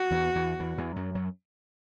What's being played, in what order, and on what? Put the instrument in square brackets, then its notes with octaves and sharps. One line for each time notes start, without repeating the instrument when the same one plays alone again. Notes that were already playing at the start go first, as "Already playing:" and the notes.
Already playing: [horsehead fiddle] F#4
[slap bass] E2 E3
E2 E3
E2 E3
E2 E3
F#2 F#3
F#2 F#3